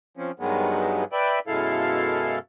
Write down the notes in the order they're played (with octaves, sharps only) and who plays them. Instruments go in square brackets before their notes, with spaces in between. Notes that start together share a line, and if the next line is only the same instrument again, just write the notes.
[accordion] F3 C4 C#4
G2 D#3 F#3 G#3 B3
B4 D5 E5 G5 B5
F#2 B2 G#3 E4 A4 F5